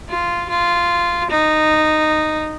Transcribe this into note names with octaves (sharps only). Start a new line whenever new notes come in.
F4
F4
D#4